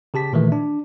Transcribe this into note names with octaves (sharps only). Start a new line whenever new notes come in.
C#3 G4 A5 B6
A#2 D#3 E3 A3
D4